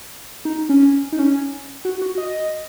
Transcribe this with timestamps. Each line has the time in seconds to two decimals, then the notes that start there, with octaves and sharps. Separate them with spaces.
0.45 D#4
0.69 C#4
1.12 D#4
1.19 C#4
1.85 F#4
2.02 F#4
2.18 D#5